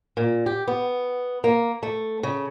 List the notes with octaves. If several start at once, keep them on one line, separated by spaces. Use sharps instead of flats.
A#2
G4
B3
A#3
A3
C#3